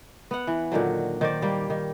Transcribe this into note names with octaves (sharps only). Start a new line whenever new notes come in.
B3 F#5
E3
A#2 D3 D#3 F#3
D#3 C5 D5
G3 A#3
D#3